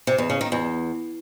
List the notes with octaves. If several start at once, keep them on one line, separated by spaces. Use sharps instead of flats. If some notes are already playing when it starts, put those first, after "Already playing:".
C3
E2
C#3
D#3
E2